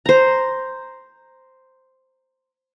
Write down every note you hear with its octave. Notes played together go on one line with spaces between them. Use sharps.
C5 A#5